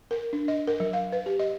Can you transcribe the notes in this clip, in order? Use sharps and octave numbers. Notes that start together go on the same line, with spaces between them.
A#4
D4
D#5
A#4
F#3
F5
B4
G4
D#5